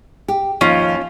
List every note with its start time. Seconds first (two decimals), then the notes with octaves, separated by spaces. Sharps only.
0.28 G4
0.61 D#2 F3 C#4 D#4 F4